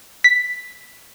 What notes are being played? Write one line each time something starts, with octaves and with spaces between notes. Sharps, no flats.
B6